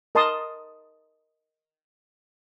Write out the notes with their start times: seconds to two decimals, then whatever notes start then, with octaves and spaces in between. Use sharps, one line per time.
0.15 A#4 D#5 A5 C6 D#6